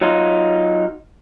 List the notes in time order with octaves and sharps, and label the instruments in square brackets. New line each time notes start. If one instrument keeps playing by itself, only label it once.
[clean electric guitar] F#3 D#4 F4